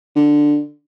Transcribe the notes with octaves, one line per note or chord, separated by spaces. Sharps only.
D3